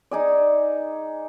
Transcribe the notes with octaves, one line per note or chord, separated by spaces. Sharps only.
D#4 G#4 D5